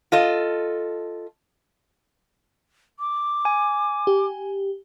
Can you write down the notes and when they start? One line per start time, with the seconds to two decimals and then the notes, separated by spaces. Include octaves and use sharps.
0.12 F4 A4 D#5
2.99 D6
3.45 G#5
4.07 G4